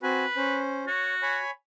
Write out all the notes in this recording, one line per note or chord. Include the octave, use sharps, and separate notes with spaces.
C4 F#4 B4 G#5
C#4 C5
F#4 C#5
C#5 G#5 B5